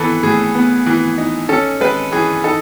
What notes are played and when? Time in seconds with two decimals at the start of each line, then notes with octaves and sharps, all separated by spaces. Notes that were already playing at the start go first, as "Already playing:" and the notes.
Already playing: E3 B3 A4 B4
0.23 A2 G#4
0.55 B3
0.86 E3
1.18 D#4
1.49 C#4 A4
1.80 G#3 B4
2.12 E3 G#4
2.44 D#4 A4